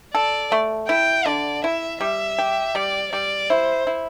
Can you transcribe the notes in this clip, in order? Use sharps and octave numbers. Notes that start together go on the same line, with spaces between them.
A4 D5
A3
E4 G5
D3 D5
E4 E5
G3 E5
G4
G3 D5
G3 D5
E4 C5
E4